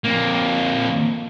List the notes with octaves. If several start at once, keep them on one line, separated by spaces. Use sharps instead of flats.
F2 A#3